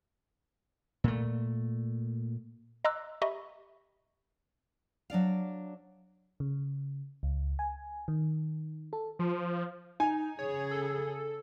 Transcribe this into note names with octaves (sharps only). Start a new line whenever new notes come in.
A#2 A3
D#5 A#5 C6 D6 E6 F#6
G4 D#5 E5 A#5 B5 C#6
F#3 D4 D5 F5
C#3
C#2
G#5
D#3
A4
F3
D#4 G#5
C#3 G#4 C#5
A4